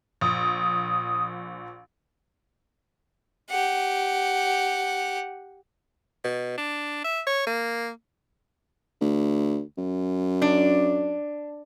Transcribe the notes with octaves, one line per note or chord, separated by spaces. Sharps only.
A#1 D#6
G4 F#5
B2
D4
E5
C#5
A#3
D2
F#2
D4